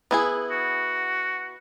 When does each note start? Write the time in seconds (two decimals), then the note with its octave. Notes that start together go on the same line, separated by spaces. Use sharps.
0.11 B3 E4 G#4
0.51 F#4